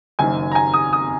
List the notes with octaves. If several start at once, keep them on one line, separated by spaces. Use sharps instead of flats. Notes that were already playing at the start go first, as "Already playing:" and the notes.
F#1 F#2 D#3 G#5
A#5
G#5
D#6
D#6